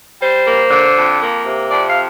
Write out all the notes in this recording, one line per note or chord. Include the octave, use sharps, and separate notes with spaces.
G3 C5
A#3
D3
F2
A#3
C3
F2 D5
F5